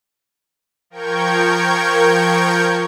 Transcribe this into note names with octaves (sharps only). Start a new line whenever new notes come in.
F3 A#4 G5 C#6 G6 G#6